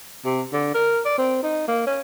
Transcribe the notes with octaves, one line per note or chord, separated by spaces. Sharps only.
C3
D3
A#4
D5
C4
D#4
A#3
C#4